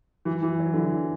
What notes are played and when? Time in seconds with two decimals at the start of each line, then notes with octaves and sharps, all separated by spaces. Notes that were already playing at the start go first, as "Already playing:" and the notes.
0.25 E3
0.42 E3
0.60 F#3
0.73 D3
0.78 E3